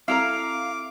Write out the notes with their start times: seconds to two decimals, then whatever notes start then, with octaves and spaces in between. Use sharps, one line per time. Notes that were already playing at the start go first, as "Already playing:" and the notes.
0.08 C4 E4 A4 F5 A#5 D6